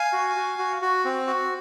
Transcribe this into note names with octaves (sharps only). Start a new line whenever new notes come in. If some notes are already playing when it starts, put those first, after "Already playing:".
Already playing: F5 G#5
F#4
F#4
F#4
F#4
C4
F#4